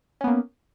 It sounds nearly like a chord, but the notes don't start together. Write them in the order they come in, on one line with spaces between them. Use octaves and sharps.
C#4 B3 A#3